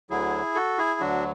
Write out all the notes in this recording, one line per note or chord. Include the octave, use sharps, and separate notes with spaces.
D2 D3 F#3 E4 G#4
F#4 A4
E4 G#4
D2 D3 F#3 D4 F#4